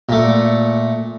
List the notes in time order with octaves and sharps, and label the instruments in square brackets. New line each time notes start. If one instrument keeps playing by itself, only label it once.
[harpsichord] A#2 A3